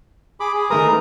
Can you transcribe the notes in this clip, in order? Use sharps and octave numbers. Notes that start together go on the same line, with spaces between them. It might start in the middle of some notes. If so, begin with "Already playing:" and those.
G#4 B5 D6
G#4
D#3 A3 A#4 B4 A#5 D#6